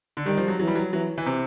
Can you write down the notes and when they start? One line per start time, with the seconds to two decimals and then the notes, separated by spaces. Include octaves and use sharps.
0.17 D3
0.26 D#3 G3
0.37 F3
0.48 F#3
0.59 E3 F#3
0.68 G3
0.75 F#3
0.92 E3 F#3
1.18 E3
1.26 C3